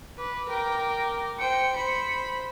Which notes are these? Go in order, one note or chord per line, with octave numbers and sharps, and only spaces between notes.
B4 D6
A#4 G5
C5 G5 C#7
C5 B5